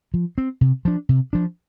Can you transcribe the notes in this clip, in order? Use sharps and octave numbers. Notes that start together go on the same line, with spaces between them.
F3
C4
C3
F3 D4
C3
F3 D4